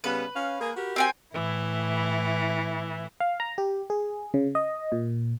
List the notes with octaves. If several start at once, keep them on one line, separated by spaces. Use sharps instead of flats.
C#3 G3 B3 B4
C#4 F5
A#3 G#4
F#4 G4 A#4
C4 G5 G#5
A2 E3 E4
F5
A#5
G4
G#4
C#3
D#5
A#2